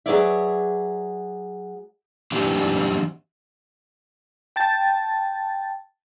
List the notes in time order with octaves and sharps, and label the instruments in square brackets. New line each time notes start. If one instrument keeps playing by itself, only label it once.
[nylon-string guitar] F#3 G#4 B4 C#5 D5 E5
[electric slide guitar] E3 F#3 D4 G4
[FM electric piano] G5 A5 A6